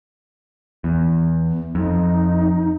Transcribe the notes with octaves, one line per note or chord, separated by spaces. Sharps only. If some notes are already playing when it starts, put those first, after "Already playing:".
E2
F2 D#4